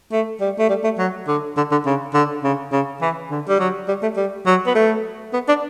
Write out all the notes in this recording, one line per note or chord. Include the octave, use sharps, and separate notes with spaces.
A3
G3
A3
G3
A3
F#3
D3
D3
D3
C#3
D3
C#3
C#3
E3
D3
G3
F#3
G3
A3
G3
F#3
B3
A3
B3
D4